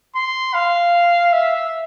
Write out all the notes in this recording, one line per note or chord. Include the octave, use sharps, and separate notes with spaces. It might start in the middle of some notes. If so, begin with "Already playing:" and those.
C6
F5
E5